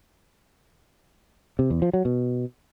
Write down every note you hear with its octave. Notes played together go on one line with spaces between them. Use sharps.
C3
E2
F3
F#3
B2